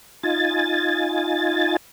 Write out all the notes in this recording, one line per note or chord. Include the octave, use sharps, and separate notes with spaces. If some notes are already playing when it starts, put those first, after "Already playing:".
D#4 F4 G#5 A6